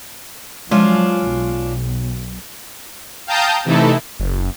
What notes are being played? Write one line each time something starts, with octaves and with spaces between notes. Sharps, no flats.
F3 F#3 G#3 C#4 D4 F4
B1
F5 G5 A5 A#5 D#6 G6
C3 E3 A3 D#4 E4 A4
F#1